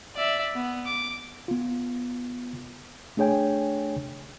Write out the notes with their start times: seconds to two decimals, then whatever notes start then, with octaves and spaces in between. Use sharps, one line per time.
0.16 D5 E5
0.56 B3
0.85 D6
1.48 B3 F4
3.17 A3 D4 G#4 C#5 G5 G#5